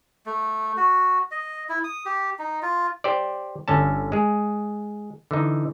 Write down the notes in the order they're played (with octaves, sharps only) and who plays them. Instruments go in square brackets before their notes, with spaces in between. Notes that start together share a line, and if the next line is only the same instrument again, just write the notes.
[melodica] A3
F#4
D#5
E4
D#6
G4
D#4
F4
[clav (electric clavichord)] G4 C5 D5
G1 D3 C#4 A5
G#3 G#4
D3 E3 D#4